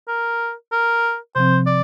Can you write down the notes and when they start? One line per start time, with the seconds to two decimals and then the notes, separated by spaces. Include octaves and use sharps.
0.08 A#4
0.72 A#4
1.35 C3 F3 C4 C5
1.66 D5